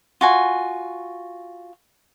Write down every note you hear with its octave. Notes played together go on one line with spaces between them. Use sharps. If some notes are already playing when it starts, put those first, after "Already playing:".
F4 F#4 G#5